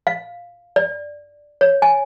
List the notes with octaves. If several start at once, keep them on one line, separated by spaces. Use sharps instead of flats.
F5
D5
C#5
G#5